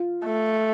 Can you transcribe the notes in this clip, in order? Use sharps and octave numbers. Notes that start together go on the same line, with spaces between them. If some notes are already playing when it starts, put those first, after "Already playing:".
Already playing: F4
A3